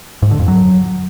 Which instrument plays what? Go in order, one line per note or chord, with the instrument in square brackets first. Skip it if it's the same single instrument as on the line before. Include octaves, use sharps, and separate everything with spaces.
[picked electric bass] G#2
D3
F2
F#3